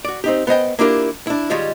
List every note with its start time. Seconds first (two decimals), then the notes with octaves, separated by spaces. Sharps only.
0.05 F#4 D5
0.24 C4 D#4 G4
0.47 B3 C5 D#5 G5
0.79 A#3 D4 E4 F4 G4 A#4
1.27 D4 E4
1.50 D#3 G3 G#3 F4 C#5